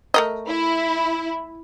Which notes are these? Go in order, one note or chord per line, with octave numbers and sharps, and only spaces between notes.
A3 A#4 D#5
E4